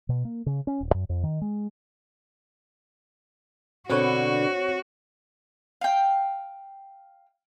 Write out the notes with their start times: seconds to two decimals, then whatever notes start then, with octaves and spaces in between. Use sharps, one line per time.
0.09 B2
0.25 A#3
0.46 C#3
0.67 C#4
0.81 D#1
0.94 F#2
1.09 F2
1.23 D#3
1.41 G#3
3.89 B2 D3 C4 F#4 B4 C#5
5.81 F5 G5